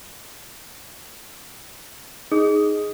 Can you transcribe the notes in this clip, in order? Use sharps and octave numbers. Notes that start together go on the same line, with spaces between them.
D#4 G#4